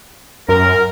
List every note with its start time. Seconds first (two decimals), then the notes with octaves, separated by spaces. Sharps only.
0.49 F#2 A#4